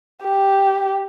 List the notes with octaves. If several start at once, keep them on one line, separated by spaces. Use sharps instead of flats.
G4